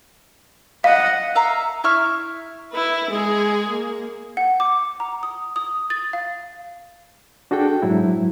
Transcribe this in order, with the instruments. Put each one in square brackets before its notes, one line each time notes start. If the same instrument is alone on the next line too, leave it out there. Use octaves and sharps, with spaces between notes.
[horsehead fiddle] D#5 F#5 [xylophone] F5
[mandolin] E5 F5 A#5
E4 E5 C#6 F6
[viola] E4 B4
G#3 G#4
A#3
[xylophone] F#5
D6
A#5
D#6
D#6
A6
F5
[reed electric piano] D4 F#4 G#4 A4 G5
G#2 F#3 E4